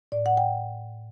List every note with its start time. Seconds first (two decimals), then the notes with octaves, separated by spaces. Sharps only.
0.12 A2 D5
0.26 F#5
0.37 G5